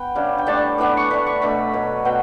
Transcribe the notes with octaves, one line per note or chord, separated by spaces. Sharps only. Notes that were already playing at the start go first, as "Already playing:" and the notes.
Already playing: B3 G5
C#3 G3 D4
G5
A2 G3 D4 A5
A2 E3 B3 D4
C#6
D3 A3 D4 B5
C#6
B2 A3 D4 B5
B2 F#3 A3
B2 F#3 B3 G5